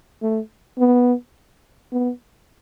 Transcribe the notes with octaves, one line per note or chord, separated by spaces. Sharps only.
A3
B3
B3